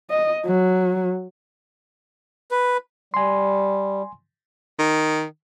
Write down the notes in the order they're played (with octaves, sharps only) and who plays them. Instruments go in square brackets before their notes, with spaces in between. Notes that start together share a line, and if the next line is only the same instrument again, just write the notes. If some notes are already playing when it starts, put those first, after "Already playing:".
[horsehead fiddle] D#5
F#3
[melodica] B4
[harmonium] G3 [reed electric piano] G#5 C6
[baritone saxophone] D#3